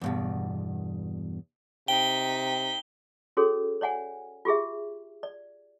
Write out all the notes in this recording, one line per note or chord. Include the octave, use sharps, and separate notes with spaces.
E2 G2 B2
C3 D#4 G5 B6 G7
C#4 F#4 G#4 A4 C#5
C#5 D5 F#5 G#5
F4 G4 G#4 E5
D5